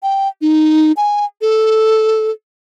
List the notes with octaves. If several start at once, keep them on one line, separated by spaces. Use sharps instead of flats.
G5
D#4
G#5
A4